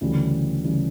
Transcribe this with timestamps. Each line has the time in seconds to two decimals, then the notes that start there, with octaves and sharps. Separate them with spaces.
0.01 D2 C#3 E3 G3
0.64 C#3 E3 G3